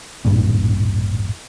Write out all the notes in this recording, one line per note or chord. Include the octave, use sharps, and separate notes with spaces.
D#1 A1 G2 A#2